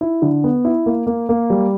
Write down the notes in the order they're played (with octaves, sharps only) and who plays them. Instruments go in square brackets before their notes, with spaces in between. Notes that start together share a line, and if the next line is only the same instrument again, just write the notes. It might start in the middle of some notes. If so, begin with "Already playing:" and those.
[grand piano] E4
D3
B3
E4
A#3
A#3
A#3
G3